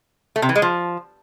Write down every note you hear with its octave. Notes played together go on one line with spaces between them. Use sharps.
A3
C3
E3
G#3
F3